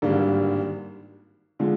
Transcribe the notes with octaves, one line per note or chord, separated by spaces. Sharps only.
G#1 G2 D3 G3 A#3
D3 F3 G#3